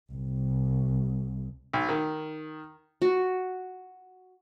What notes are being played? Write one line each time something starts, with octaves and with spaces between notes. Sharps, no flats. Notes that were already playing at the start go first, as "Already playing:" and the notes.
C2
B1
D#3
F#4